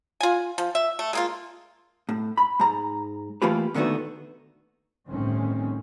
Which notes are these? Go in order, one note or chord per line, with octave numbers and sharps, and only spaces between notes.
F4 G#5
F3
E5
A3
G#3 A#3 F4
A2
B5
G#2 A#5
E3 A3 A#3 F4 G4 B4
A#2 D3 D#3 A3 B3 F#4
G1 C2 A2 D#3 C4 C#4